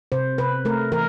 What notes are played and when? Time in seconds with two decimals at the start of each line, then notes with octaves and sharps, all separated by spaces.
0.12 C3 C5
0.38 C3 B4
0.65 A3 A#4
0.92 E3 A#4